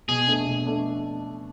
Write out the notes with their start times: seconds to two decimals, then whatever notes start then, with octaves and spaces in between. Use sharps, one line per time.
0.08 B2 G#4
0.27 A3 D4
0.46 B2
0.66 A3 D4